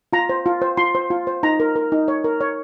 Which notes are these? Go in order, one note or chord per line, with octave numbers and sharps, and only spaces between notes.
F4 A#5
C5
F4
C5
F4 C6
C5
F4
C5
D#4 A#5
A#4
A#4
D#4
C#5
A#4
C#5